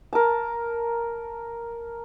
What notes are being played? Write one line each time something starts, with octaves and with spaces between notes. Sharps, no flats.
A#4 A5